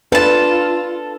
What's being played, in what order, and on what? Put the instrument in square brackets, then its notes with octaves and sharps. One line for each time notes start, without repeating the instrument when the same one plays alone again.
[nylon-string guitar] D4 [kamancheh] F4 [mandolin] A4 A5 [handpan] B4